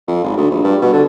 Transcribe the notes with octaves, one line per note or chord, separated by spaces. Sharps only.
F2
G#1
D2
A#1
G2
B2
D3